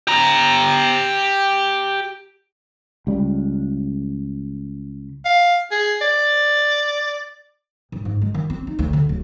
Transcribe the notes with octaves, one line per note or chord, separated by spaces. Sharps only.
G4 A#5
C#2 G3
F5
G#4
D5
G2
G#2
G#3
D#3
C4
D#4
D2
D3
D1